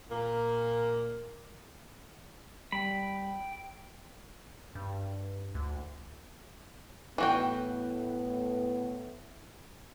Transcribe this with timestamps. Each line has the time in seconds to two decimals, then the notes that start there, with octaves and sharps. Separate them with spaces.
0.10 A#2 A#3
2.72 G3 G5 B5
4.75 G2
5.55 D2
7.18 A2 E3 A3 B3 F#4 G5